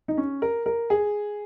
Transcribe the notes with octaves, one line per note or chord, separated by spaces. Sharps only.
D#4
C#4
A#4
A#4
G#4